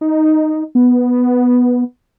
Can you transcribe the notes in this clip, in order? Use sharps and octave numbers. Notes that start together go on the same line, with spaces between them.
D#4
B3